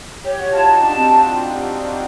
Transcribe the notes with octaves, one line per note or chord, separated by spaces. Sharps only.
G4 C#5
F#4
F4 A5
D#4
D4 A5
C4